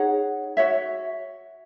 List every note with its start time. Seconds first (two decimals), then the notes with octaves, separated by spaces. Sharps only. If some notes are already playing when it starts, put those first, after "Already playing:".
Already playing: D#4 G#4 C#5 F#5
0.57 F#4 C#5 E5